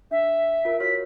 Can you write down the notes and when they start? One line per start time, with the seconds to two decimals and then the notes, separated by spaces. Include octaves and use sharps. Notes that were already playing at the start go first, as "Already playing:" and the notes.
0.11 D4 E5
0.65 F4 A#4
0.80 F#4 C#5 F6 B6